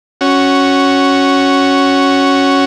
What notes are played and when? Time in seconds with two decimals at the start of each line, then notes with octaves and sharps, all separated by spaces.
0.21 C#4 F#4